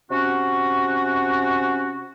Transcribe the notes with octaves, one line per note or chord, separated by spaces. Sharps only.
C3 C#4 F#4